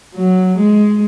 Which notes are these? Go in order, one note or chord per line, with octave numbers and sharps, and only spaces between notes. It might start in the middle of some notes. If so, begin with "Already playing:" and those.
F#3
G#3